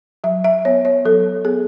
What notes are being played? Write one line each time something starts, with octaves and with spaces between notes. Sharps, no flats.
F#3 E5
E5
B3 C#5
C#5
F#3 A4
B3 G#4